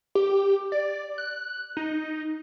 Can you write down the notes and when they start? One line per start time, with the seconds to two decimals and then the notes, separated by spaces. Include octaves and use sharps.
0.15 G4
0.72 D5
1.18 F#6
1.77 D#4